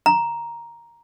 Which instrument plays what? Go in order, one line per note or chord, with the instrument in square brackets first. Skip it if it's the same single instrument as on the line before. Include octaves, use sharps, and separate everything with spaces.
[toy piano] A#5